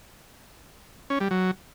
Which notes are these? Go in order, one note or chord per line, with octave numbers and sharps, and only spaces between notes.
C#4
G3
F#3